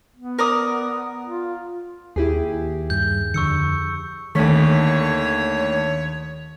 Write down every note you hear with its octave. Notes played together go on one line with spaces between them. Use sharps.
B3
A#4 D5 D#6
F4
D#2 E4 G4 G#4
G2 G6
F2 D3 C#6 E6 C#7
D#2 D3 D#3 A3 C#5 C#6 B6